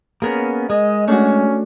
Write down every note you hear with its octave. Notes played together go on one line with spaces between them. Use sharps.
A#3 B3 C#4 G#4 A#4
G#3 G#4 D#5
A3 C#4 D4 F#4